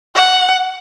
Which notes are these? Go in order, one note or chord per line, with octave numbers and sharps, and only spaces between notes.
F#5